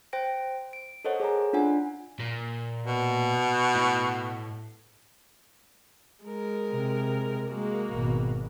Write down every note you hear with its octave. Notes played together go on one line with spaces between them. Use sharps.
C5 G5 A#6 D7
D7
A4 A#4 C5 C#5 D#5 F#5
G#4 C#5 G#5 A#5
D4 F4 F#5 G#5
A#2
B2
A2
G#3 A#4
C3
G#3 A#3 F#4
G#1 B2